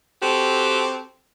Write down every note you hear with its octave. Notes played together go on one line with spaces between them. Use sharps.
C4 F#4 G4 A4